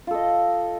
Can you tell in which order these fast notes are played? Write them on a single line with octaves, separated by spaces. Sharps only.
F4 A4 D#5